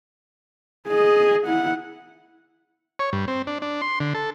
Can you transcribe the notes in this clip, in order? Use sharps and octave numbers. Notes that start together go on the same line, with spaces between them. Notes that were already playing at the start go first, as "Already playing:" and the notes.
G#4 D#5
E4 F#5
C#5
G2
C4
D4
D4
C6
D3
A4